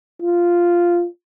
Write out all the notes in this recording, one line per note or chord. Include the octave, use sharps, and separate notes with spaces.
F4